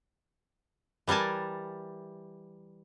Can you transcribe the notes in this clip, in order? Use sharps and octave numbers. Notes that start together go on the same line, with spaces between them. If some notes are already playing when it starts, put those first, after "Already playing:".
E3 G3 A#4 G#5 A5